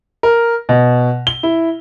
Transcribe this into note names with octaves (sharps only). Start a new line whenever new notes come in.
A#4
B2
G7
E4